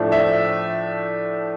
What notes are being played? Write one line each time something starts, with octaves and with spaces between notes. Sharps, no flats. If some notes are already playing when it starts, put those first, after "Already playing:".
Already playing: A2 F3 A3 D4
E5